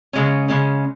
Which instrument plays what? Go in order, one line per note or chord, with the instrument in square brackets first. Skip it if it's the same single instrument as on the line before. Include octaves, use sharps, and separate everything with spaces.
[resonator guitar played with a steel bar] C#3 G#3 C#4
C#3 G#3 C#4